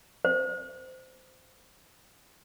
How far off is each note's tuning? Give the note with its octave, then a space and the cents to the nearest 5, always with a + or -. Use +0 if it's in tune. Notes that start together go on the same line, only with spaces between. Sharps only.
C5 -20